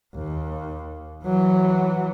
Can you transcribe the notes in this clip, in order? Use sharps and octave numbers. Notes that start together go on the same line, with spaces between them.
D#2
E3 F#3